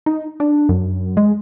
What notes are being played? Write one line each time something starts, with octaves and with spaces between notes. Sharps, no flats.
D#4
D4
F#2
G#3